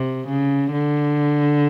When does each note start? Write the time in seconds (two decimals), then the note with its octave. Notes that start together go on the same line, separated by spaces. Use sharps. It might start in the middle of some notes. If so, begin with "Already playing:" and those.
Already playing: C3
0.28 C#3
0.72 D3